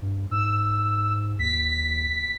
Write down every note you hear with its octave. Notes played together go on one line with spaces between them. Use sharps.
G2
G#2 E6
D#2 B6